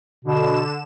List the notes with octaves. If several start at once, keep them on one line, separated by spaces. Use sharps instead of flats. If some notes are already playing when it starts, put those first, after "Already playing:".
B2 D3 E7